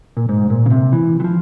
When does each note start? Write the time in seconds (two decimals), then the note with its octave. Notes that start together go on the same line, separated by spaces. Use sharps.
0.17 A#2
0.29 G#2
0.50 A#2
0.66 C#3
0.70 C3
0.92 E3
1.20 E3
1.24 F3